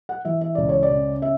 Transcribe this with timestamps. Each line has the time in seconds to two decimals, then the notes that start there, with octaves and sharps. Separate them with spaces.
0.09 F#5
0.25 E3 E5
0.41 E5
0.55 C#2 D5
0.69 C#5
0.83 D5
0.90 C#3
1.22 E5